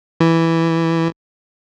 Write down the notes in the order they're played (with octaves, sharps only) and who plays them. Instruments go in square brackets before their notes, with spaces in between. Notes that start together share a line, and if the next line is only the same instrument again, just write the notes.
[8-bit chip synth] E3